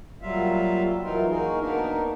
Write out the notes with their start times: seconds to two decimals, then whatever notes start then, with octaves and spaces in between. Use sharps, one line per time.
0.22 F#3 G3 A#3 F4 E5 F5
1.03 E3 F#3 D#4 F4 A#4
1.29 A#3 D#4 F#4 G#4 A#4
1.60 A#3 B3 D4 D#4 A#4